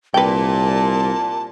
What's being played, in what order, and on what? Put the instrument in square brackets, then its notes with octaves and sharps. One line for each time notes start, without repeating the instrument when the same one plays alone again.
[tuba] C2 [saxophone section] A#2 [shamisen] B4 G5 [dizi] A5